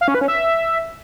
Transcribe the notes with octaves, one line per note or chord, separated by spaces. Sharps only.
F5
C#4
B4
C#4
E5